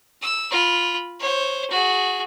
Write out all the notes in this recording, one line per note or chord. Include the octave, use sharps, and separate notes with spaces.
E6
F4 B5
C5 C#5
F#4 G#4